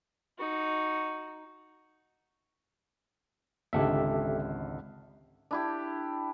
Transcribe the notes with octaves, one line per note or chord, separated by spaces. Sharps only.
D#4 F#4
G#1 C#2 D3 G4 A4 E5
D4 E4 G4